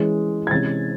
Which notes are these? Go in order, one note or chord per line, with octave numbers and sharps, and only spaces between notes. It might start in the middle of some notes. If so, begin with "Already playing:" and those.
Already playing: E3 G#3 C#4
G#6
C3 E3 G#3 C#4 A6